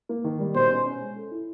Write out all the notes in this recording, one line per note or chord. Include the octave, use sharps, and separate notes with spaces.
A#3
D#3
G3
B2 C5
C#4
C#4
G#3
A4
E4